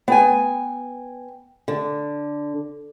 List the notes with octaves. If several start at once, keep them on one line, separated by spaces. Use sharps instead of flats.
B3 G5 G#5
D3